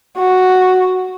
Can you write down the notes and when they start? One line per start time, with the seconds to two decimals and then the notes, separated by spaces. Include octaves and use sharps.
0.18 F#4